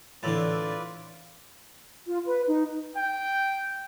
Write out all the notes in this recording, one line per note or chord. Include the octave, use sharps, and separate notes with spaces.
A2 D3 E3 F4 B4 D5 E6 A6
F4
B4
D#4
G5